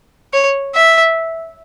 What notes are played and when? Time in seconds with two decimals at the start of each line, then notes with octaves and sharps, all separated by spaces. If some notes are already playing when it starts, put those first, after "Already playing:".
0.33 C#5
0.75 E5